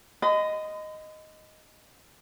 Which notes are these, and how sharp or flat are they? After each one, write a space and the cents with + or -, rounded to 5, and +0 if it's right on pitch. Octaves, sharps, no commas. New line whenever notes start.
D#5 +0 B5 +45